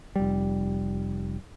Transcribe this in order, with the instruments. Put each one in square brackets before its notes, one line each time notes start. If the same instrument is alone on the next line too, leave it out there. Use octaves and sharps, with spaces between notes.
[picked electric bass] F1 G3